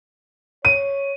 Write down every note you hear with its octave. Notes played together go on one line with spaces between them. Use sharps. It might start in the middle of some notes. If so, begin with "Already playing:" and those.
C#5 D#7